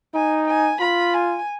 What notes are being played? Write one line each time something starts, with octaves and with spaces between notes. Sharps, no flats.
D#4 G#5
G#5
F4 B5
G#5